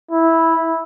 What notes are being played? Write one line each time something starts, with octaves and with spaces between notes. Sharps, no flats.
E4